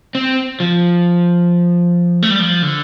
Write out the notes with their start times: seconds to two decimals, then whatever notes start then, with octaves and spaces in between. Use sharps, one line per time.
0.15 C4
0.60 F3
2.22 A3
2.31 G3
2.39 F3
2.62 D3